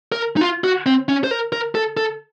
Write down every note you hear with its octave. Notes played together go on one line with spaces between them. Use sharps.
A#4
D#4
F4
F#4
C4
C#4
C5
A#4
A#4
A4
A4